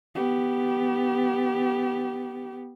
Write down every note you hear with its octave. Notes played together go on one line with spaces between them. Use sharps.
B3 G4